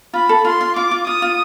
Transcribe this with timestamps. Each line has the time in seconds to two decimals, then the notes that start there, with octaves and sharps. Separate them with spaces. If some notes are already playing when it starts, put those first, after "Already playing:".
0.13 F4 B5
0.29 A4
0.45 F4 C6
0.61 F4
0.76 F4 D6
0.91 F4
1.06 F4 D#6
1.22 F4